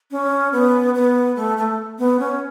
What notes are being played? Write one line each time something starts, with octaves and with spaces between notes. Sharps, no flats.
C#4
B3
B3
A3
A3
B3
C#4